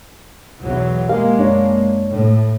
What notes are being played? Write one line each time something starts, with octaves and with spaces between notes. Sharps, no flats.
B1 E2 F#3
G#3 A#3 G4 A#4 F5
F#2 D4 C#5
A2